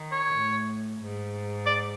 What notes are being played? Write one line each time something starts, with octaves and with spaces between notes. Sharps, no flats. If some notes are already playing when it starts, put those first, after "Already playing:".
Already playing: D#3
C#5
A2
G#2
D5